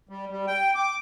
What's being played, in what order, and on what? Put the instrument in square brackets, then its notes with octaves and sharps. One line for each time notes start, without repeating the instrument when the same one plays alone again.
[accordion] G3
G3
G5
D6